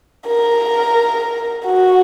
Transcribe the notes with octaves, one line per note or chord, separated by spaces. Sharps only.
A#4
F#4